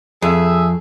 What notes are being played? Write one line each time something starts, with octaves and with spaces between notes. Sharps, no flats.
F2 G#4 E5